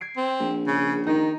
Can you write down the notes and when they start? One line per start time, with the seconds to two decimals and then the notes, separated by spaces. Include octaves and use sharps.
0.01 G#6 C7 D7
0.17 C4
0.40 A#1
0.67 C#3
1.07 D#3 D#4